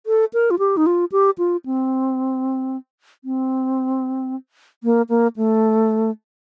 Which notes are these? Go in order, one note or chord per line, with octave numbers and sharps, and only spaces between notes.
A4
A#4
F4
G4
D#4
F4
G4
F4
C4
C4
A#3
A#3
A3